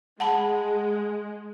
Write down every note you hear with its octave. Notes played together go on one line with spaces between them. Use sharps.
G#3 F#5 A5 B5